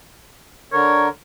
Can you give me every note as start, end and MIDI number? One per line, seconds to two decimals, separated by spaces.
0.73 1.09 50
0.73 1.09 70
0.73 1.06 73